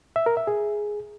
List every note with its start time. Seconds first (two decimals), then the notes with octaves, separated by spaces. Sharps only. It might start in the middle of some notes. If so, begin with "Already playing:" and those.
0.16 E5
0.26 A#4
0.37 E5
0.47 G#4